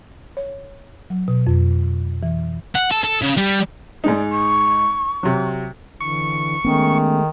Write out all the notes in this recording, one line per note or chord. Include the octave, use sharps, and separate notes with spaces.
C#5
F#3
B2
F2
E3
F#5
A4
A4
C#3
G3
G#2 G#3 D#4 D5
C#6
C3 F#3
D3 E3 C#6
D#3 G#3 A3 B3 C#4